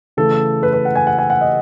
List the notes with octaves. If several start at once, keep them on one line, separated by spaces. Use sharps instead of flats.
C#3 E3 A3 A4
B4
B4
F#5
G#5
F#5
G#5
F#5
D#5